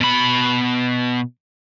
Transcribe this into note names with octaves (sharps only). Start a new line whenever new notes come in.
B2 B5